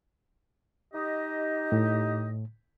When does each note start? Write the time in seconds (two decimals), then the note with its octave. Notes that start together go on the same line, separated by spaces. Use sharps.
0.94 D#4 G4 D#5
1.72 A2